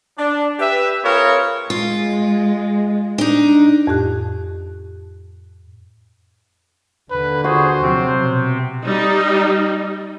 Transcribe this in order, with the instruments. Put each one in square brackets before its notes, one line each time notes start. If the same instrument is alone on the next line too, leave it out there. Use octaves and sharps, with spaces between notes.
[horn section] D4
G4 B4 E5
C4 F4 G#4 A#4 B4 C#5
[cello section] G#3 [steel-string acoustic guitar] F4
[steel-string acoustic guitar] D4 D#4
[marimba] F2 A2 G4 F#6
[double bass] D#2 D3 [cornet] B4
[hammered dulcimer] F#4 [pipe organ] G#4 [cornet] C5
[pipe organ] C3 C4 [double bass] F3 F#3
[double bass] B2
[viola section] G3 D#4